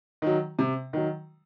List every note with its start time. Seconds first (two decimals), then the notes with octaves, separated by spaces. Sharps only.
0.22 D#3 F#3
0.59 C3
0.93 D#3 F#3